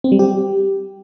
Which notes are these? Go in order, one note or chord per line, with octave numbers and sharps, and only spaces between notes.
C4
G3
G4